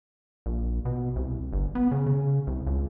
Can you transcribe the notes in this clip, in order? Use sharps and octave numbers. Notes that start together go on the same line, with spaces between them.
A#1
B2
C2
G1
B3
C#3
C#3
C2
C#2